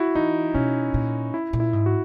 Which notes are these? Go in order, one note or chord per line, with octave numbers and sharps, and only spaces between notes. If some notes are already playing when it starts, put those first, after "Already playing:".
Already playing: E4 F#4
E3 D#4
B2 C#4
A#2
E4
A#2
E4
G#2
F#4